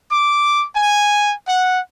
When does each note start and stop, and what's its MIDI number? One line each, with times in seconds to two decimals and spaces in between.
0.11 0.65 86
0.73 1.32 80
1.47 1.78 78